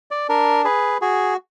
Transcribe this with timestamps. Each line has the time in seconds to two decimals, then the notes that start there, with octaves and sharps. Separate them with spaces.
0.11 D5
0.29 D4 A#4
0.64 G#4 B4
1.01 F#4 G#4